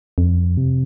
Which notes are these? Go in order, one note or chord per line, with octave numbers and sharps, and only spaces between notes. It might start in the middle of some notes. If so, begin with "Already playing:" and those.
F2
C3